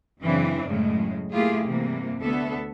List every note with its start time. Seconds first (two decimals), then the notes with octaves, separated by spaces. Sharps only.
0.22 F#2 C#3 E3 C4 D4
0.68 F#2 A2 C#3 G#3
1.31 A3 A#3 E4 F4 G4 G#4
1.66 G2 C3 E3 A#3
2.20 D2 B3 A4 E5